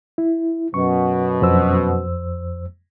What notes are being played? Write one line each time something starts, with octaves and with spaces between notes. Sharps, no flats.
E4
F#2 B2 C#6
F2 C5 E6